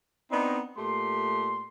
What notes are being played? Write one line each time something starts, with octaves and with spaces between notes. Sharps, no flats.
B3 C4 D4 D#4
A#2 A3 G4 C6